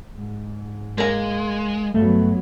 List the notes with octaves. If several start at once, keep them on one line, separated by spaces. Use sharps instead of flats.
G#2
G#3 A#3 A#5
G2 F#3 A3 B3